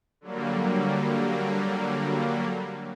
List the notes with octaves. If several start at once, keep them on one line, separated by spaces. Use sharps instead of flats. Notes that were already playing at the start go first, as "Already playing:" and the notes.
D3 F#3 G3 A#3